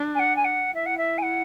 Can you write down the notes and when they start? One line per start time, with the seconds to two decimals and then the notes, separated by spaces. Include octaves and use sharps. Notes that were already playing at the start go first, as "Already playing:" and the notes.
Already playing: D4
0.15 G#5
0.19 F#5
0.36 G#5
0.44 F#5
0.74 E4 E5
0.86 F#5
0.97 E5
1.18 G#5
1.22 F#5